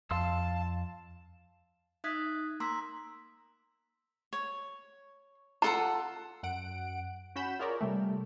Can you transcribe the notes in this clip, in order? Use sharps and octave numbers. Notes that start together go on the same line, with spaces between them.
F2 F5 A5 C6 E6
D#4 E5 D#6 F#6 G#6 B6
A#3 A#5 C6 D6 E6 B6
C#5
F4 A4 F#5 A#5
F#2 F#5 D7
C#4 F#4 F#5 B5 G6 E7
F4 G#4 A#4 C#5 D5
C3 G3 A3